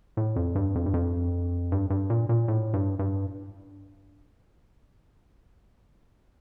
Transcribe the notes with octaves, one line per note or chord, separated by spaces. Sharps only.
A2
F2
G2
F2
G2
F2
G2
G2
A#2
A#2
A2
G2
G2